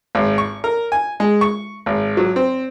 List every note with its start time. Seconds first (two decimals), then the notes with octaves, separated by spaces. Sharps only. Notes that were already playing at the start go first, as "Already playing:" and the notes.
0.15 G#1
0.38 C#6
0.64 A#4
0.92 G#5
1.20 G#3
1.41 C#6
1.86 G#1
2.17 F#3
2.36 C4